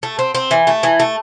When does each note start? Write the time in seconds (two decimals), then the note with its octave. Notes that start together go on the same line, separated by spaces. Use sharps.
0.03 A3
0.19 C4
0.35 C4
0.51 E3
0.67 A3
0.83 E3
1.00 A3